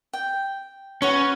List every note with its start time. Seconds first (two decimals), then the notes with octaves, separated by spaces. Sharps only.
0.13 G5
1.02 C#4 F#4 B4 C#6